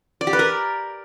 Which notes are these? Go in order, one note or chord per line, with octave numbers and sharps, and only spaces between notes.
D5
G4
B4
A#4